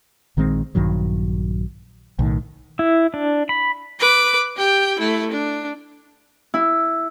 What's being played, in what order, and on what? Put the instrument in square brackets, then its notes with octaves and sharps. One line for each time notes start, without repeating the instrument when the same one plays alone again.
[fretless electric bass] A#1 D#3 G#3 C4
A#1 G2 D#3 F#3
B1 A2 D#3
[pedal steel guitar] E4
D4
B5
[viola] B4 D6
G4 G5
A3 E4
D4
[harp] E4